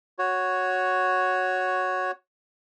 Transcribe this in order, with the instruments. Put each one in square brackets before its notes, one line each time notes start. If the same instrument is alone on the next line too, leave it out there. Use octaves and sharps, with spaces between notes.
[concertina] F#4 C#5